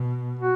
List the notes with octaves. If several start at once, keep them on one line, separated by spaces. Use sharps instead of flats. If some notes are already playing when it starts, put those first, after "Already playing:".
Already playing: B2
F#4